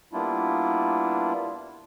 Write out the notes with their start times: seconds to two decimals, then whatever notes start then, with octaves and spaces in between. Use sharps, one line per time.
0.13 G3 A#3 B3 D4 E4 F4